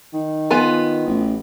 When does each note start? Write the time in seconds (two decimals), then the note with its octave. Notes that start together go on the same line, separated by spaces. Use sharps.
0.13 D#3
0.51 B3 F4 G#5
1.07 A1